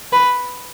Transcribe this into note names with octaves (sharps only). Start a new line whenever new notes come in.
B4